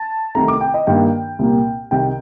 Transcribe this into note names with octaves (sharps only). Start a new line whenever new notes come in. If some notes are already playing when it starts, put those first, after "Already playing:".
Already playing: A5
C2 C3 D#3 A3 A#5
D6
G5
D#5
G2 D#3 A#3 G5
C2 A#2 G3 A#3
C2 C3 D#3 G5